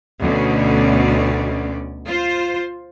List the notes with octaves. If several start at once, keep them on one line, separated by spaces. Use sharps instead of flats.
D2 B2 C#4 D5
F4 C5